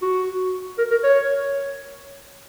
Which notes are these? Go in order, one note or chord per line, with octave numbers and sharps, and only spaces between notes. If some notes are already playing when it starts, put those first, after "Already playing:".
F#4
A#4
A#4
C#5